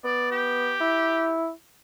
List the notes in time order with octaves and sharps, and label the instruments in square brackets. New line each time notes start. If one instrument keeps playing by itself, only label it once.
[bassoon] B3 [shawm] D5
[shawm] G4
[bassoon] E4